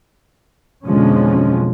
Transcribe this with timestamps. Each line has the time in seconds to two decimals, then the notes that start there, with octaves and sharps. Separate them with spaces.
0.86 B1 F2 D3 F3 G#3 C#4